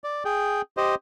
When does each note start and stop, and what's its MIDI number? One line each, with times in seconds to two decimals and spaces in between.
0.04 0.24 74
0.25 0.62 68
0.25 0.62 79
0.77 0.95 67
0.77 0.95 72
0.77 0.95 75